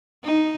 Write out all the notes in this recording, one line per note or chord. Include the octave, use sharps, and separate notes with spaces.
D#4